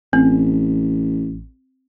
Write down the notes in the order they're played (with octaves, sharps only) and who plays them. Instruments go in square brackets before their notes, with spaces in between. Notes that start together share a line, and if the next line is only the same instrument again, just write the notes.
[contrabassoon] A1 [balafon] C4